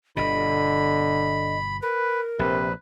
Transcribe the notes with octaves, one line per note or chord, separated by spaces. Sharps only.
G1 B2 D3 D#5 B5
A#4 B4
A#1 C3 B4